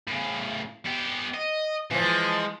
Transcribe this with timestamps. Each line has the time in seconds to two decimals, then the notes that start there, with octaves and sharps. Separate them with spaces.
0.08 A2 C#3
0.86 B3 G4
1.34 D#5
1.91 A#2 E3 F3
2.03 G#3